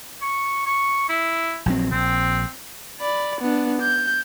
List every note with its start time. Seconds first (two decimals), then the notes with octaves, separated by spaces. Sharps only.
0.22 C#6
0.66 C#6
1.09 E4
1.66 A#1 F#3 C4
1.92 A#1 C4
3.01 D5 B5
3.41 B3 D4
3.81 G6